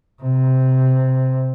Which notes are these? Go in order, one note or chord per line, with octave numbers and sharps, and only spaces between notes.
C3